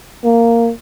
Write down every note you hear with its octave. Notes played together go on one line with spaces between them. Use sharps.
A#3